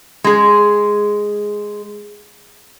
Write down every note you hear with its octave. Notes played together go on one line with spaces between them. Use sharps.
G#3 G#4